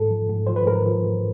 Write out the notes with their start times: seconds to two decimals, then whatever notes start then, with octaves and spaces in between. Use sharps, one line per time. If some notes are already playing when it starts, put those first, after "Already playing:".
Already playing: G#2 A4
0.11 F3
0.29 G#2
0.47 F3 C5
0.56 B4
0.66 G#2 A#4
0.86 F3
1.04 G#2